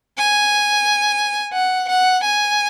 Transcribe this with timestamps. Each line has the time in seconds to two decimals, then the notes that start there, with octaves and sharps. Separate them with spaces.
0.18 G#5
1.53 F#5
1.88 F#5
2.23 G#5